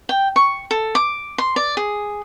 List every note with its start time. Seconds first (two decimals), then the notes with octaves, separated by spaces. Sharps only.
0.09 G5
0.36 C#6
0.71 A4
0.95 D6
1.38 C6
1.56 D5
1.77 G#4